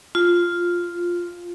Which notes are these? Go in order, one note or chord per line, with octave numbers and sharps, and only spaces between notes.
F4